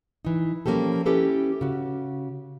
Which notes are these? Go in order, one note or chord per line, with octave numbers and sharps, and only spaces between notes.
E3 D#4
F3 G3 A#3 C#4 G4 A4
C#4 E4 G4 A4 B4
C#3 F#4